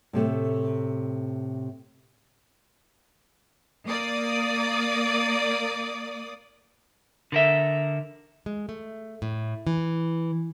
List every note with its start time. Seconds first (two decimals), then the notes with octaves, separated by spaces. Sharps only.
0.13 A2 C3 A3
3.87 A#3 D5 D#6
7.32 D3 A#4 E5
8.46 G#3
8.69 A3
9.22 A2
9.67 E3